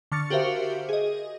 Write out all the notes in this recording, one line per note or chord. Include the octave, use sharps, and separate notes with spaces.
D3 C#6 F6 A6 C#7
F#4 G4 A#4 C5 E5 F5
G#4 D#5